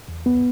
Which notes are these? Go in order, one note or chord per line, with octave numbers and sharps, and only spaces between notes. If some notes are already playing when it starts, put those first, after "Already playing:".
E2
C#2 B3